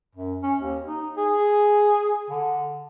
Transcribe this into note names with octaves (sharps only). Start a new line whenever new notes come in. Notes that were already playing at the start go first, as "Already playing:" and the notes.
F#2
C#4
D#2
D#4
G#4
D3